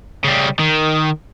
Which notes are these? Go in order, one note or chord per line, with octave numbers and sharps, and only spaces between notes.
C#3 G3
D#3